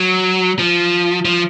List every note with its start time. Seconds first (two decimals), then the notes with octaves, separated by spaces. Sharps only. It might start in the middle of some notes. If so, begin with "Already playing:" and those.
Already playing: F#3
0.59 F3
1.25 F3